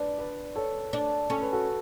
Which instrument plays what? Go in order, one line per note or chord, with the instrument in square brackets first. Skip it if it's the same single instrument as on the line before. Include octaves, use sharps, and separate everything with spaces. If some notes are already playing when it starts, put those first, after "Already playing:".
Already playing: [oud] D4 [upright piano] B4 D5
[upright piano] B4 D5
A4 C#5
[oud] D4
[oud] C#4 [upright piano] A4
[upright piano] B4
F#4 A4